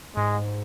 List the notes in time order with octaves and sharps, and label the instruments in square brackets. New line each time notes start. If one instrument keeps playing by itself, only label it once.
[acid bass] G#2 [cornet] G#3